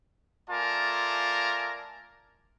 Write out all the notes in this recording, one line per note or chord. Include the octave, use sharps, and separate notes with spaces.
A3 F4 A#4 D5 G#5 A5